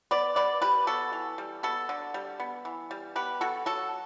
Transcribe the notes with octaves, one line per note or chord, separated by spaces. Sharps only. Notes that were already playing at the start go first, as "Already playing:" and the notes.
B3 B4 D5
B2 B4 D5
G3 G4 B4
B3 F#4 A4
E3
G3
B3 F#4 A4
D3
G3
B3
E3
G3
B3 G4 B4
B2 F#4 A4
F#3 F#4 A4